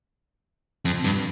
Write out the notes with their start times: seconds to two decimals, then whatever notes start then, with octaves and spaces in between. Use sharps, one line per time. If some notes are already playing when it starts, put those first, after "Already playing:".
0.85 F2
1.04 G2